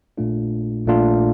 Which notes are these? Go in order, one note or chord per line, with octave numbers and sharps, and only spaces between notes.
A#1 A#2 A3 D4 F4
A#1 A#2 A3 D4 F4